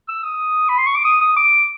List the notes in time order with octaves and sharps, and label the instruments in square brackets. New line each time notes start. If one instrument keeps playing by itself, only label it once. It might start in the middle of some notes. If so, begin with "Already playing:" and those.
[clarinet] E6
D#6
B5
C6
C#6
D6
D#6
D#6
D6